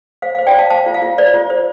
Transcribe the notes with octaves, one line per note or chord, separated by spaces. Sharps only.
C5 F5
C5 F5
D5 G5
C5 F5 A5
C5 F5 A5
F4
F5
F4
C5 D5
F4
C5